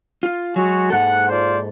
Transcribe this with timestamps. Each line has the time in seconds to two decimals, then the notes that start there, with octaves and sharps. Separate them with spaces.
0.23 F4
0.56 F#3 G#3 F#4 G#5
0.90 G#2 A4 F#5
1.28 F4 C5 D5